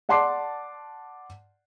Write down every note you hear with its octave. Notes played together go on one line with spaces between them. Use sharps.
D5 F#5 A5 C6 D6 C7